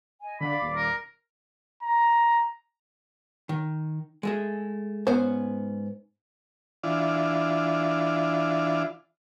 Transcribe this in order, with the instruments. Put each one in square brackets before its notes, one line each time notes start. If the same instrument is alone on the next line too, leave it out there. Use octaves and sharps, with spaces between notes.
[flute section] D#5 G#5
[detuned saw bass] D3 [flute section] D5 F5 D6 [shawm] B5
[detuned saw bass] D#1
[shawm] A#4
[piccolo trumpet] A#5
[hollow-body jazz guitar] D#3
G#3 A3 G#4
[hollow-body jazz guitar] G#2 B3 C#4 [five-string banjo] C5
[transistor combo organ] E3 D4 F4